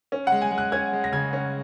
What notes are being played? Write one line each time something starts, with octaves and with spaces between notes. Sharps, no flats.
C#4
G#3 F#5
G#5
G#3
F#6
C#4 G#6
G#3
A#6
C#3 G#6
C#4